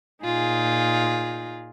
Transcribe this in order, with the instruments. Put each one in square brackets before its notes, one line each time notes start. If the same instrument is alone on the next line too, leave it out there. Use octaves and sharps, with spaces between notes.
[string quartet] A#2 D#4 F4 G#4